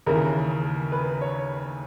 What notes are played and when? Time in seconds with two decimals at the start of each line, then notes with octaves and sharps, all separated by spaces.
0.07 D#2 C#3 E3 A#4
0.92 B4
1.21 C#5